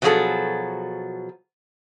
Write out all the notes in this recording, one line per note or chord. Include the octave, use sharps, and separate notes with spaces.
B2 F3 F#3 G#3 G#4 A4